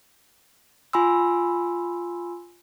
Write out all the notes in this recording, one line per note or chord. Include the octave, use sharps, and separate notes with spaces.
F4 G#5 B5 C6 E6